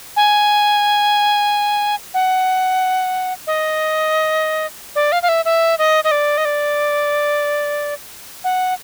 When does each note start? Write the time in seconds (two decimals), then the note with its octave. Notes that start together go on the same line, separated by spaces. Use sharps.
0.16 G#5
2.14 F#5
3.47 D#5
4.95 D5
5.12 F5
5.22 F5
5.29 E5
5.45 E5
5.79 D#5
6.04 D#5
6.11 D5
6.38 D#5
6.45 D5
8.44 F#5